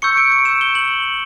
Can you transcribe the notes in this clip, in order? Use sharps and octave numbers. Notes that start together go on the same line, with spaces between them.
C#6 E6 G6 C#7
D7
D7
E7
G7
F#7